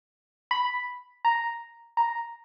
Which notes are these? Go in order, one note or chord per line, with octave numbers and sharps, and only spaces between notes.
B5
A#5
A#5